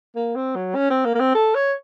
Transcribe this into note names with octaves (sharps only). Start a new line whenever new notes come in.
A#3
C4
F#3
C#4
C4
A#3
A#3
C4
A4
C#5